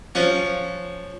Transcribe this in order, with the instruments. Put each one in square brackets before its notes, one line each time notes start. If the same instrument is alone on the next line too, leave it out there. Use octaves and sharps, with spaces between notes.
[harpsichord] F3 C#4 F#5